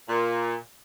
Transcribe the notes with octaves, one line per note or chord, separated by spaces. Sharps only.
A#2